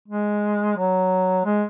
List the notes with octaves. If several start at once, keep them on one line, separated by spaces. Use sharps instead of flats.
G#3
F#3
G#3